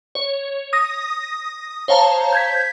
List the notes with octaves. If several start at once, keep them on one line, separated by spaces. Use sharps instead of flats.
C#5
D#6 A#6
C5 C#5 F5 A5 A#5
G6 G#6 B6